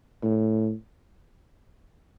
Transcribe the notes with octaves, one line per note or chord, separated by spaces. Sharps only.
A2